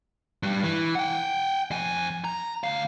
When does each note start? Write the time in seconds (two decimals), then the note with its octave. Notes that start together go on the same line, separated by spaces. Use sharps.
0.43 G2 G3
0.64 E3
0.95 F#5 G5
1.71 F2 G#5
2.24 A#5
2.64 D2 F5